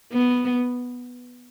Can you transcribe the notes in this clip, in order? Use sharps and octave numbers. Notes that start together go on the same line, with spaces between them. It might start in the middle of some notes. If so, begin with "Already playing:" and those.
B3